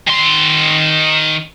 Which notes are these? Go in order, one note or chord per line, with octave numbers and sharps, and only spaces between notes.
D#3 C6